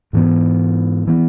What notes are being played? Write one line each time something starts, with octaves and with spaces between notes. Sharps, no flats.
G#2 E3 B3
E3 B3